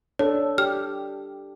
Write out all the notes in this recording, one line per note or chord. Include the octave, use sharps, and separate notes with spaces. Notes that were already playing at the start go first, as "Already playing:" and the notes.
D4 A4 C#5
G4 F6